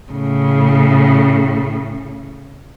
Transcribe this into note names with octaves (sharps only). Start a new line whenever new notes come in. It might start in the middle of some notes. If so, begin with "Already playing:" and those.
A2 C#3